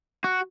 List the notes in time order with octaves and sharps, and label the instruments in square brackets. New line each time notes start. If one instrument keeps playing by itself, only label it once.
[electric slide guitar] F#4